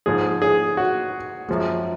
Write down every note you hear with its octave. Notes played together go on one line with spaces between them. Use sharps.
G#2 F3 G#3 G#4
G#4
F#4
F#2 F3 G#3